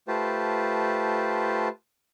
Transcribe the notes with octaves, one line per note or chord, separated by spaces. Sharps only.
A3 F4 G4 B4 C5 A5